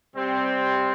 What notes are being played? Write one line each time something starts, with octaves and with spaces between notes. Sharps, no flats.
C3 G3 C4